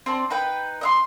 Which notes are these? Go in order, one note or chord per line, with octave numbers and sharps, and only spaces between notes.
C4 D5 A5
D#4 B4 G5
D#5 E5 C6